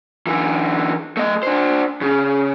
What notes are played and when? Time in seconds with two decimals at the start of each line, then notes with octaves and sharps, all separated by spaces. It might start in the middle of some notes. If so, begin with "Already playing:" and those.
0.27 D3 E3
1.17 A3 D#5
1.43 D4 C5
2.01 C#3